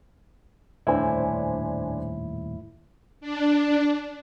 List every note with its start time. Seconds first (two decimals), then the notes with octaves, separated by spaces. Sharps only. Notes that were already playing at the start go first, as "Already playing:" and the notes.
0.87 D#1 F2 A2 D4 E4 C5 G#5
3.21 D4